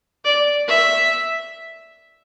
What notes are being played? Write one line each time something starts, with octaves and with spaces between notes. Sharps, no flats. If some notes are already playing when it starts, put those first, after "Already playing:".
D5
E5